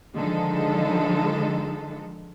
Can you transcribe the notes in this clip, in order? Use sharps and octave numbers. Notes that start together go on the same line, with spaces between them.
D3 D#3 F3 G#3 D#4 A4